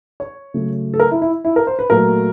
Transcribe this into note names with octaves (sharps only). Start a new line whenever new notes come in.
C#5
C#3 F#3 A3
A4
A#4
E4
E4
E4
A#4
C5
B4
A#2 F#3 A3 A#4